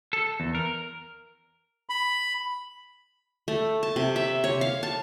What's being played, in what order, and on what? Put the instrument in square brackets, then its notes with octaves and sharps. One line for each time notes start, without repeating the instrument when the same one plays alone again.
[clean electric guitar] A4
E2
A#4
[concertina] B5
[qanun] A3
A5
C3
E5
C#5
F5
A5